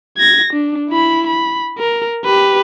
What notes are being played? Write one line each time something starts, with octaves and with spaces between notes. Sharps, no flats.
G#6 A#6
D4
E4 B5
B5
A#4
G4 B4